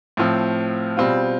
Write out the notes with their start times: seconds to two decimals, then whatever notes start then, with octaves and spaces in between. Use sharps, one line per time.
0.17 A2 F3 C4
0.97 B2 G3 C4 F4